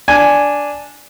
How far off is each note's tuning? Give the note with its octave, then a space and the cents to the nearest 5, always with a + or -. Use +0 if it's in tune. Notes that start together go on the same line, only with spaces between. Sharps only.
D4 -5 G#5 +0